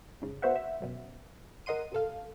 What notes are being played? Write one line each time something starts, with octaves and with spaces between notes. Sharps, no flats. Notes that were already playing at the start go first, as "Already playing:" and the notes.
F2 G#2 C#3
B3 F#4 C5 E5 F#5
E5
G#1 F#2 B2
G#1 A#4 D#5 F#5 C6 D#7
C2 G2 A4 F5